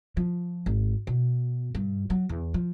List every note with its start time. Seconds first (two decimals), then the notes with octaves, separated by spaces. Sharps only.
0.17 F3
0.66 G#1
1.07 B2
1.75 G2
2.10 F#3
2.29 E2
2.54 F3